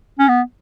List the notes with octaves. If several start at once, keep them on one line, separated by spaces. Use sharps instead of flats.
C#4
B3